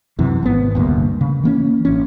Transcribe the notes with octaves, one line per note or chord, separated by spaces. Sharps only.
F#2 C3 E3
G#1 G#2 B3
F1 D2 G2 A#3
C#3
E3 A#3 C#4
A1 C#4